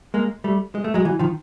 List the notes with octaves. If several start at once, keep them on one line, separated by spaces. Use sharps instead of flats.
G#3 A#3
G3 A3
G#3
A3
F#3 G#3
E3 F#3
D#3 F3